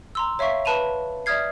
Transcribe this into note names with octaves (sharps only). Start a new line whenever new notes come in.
A#5 C6 E6
C#5 E5 F5 C#6 B6
B4 A5 B5 D#7 F7
D5 E5 D#6 F6 G#6 C7